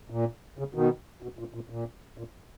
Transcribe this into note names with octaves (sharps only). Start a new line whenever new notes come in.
A#2
C#3
B2 D#3
B2
A#2
A#2
A#2
A#2